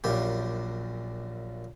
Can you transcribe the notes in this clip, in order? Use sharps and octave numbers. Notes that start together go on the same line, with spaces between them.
A#1 F#2 A#2 G4